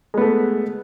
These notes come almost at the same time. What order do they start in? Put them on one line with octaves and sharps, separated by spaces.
G#3 B3 A3